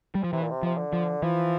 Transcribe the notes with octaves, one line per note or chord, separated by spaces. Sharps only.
G3
F3
C3 E3
A#2
C3
C3 F3
D3
F3
E3 F3